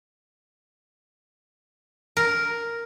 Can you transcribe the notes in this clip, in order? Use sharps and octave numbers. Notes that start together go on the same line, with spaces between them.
A#4